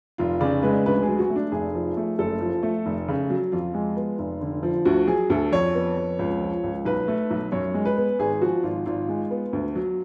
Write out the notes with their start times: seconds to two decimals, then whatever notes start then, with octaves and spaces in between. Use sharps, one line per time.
0.18 F1 F4
0.41 C#3 D5
0.63 G#3 B4
0.86 D2 B4
1.02 F#3 G#4
1.19 F#4
1.30 A3
1.36 D4
1.52 F1 G#4
1.75 F3
1.97 A3
2.19 F#1 A4
2.41 F3
2.63 A3
2.86 F1
3.08 C#3
3.30 F#3
3.52 F2 F4
3.74 G#3
3.96 B3
4.19 F1
4.41 D3
4.63 F3
4.85 D2 F#4
5.08 F#3 G#4
5.30 D2 A4
5.52 F2 C#5
5.75 B3
5.97 F2
6.19 C#2
6.41 F3
6.64 C#2
6.85 B1 B4
7.08 A3
7.31 B1
7.52 F#2 C#5
7.74 G#3
7.85 B4
7.97 B3
8.19 G#1 G#4
8.41 F3 F#4
8.63 G#1 F4
8.86 G#1 F4
9.08 G#3
9.31 B3
9.53 D2
9.75 F#3